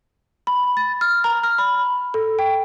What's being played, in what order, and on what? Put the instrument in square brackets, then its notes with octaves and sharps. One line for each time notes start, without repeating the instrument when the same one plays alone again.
[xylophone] B5
A6
F6
A#5
F6
B5
A4
G5